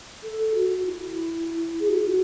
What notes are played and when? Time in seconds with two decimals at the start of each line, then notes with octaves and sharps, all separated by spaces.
0.23 A4
0.54 F#4
0.85 E4
1.80 G#4
1.88 F#4
1.99 E4
2.09 F#4